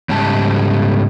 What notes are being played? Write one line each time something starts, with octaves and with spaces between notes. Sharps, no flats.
G#2 C#3 G3 A5